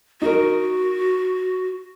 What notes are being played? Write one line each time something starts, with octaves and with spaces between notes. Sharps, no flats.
D#4 F#4 A#4